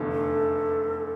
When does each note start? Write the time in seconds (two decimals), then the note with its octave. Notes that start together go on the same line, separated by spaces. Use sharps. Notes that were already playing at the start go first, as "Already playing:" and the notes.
Already playing: F1 E2 D3 A3
0.12 A4